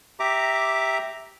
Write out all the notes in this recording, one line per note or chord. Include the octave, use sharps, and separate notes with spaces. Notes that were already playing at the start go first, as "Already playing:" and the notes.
G4 E5 A#5 D6